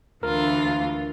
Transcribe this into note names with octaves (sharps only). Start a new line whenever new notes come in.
D2 E3 F4 A#4